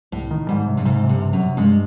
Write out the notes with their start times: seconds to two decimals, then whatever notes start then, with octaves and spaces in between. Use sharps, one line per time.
0.12 C2 A2
0.31 D#3
0.49 G#2 G3
0.67 C3
0.77 G2
0.85 G#2 C3
1.04 C3
1.09 G2
1.22 C3
1.33 F#2
1.39 C3
1.57 G2 G#3